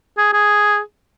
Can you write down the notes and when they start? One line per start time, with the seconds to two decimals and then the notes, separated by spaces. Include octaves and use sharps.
0.17 G#4
0.33 G#4